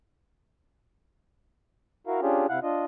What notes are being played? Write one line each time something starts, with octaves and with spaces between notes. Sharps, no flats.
E4 F#4 A#4 F5
C#4 D4 F4 G4 G#4
C3 E4 F5 F#5 F#6
D4 F4 D#5